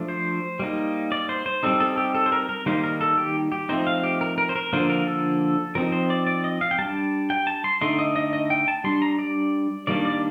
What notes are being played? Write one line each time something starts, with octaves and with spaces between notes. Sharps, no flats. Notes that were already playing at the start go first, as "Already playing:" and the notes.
Already playing: F3 A3 D4
C5
G3 A#3 D#4
D5
C5
C5
G3 C4 D#4 A4
A4
G4
A4
C5
A#4
A#4
D#3 G3 A#3 D#4 C5
A#4
A4
G4
G4
F3 A3 C4 D#4 C5
F5
G4
A#4
A#4
C5
A#4
D3 F3 A#3 D4 C5
A#4
A4
F3 C4 D#4 A#4
C5
D5
D5
D#5
F5
G5
G3 D4 A5
G5
A5
C6
D3 A3 D#4 C6
D#5
D#5
D#5
G5
A5
G3 D4 C6
A#5
D5
D#3 G3 A#3 D4 D5
D5